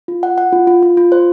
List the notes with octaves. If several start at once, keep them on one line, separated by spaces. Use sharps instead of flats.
F4
F#5
F#5
F4
F4
F4
F4
C5